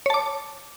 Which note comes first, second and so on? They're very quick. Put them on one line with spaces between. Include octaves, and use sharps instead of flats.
C#5 A5 D6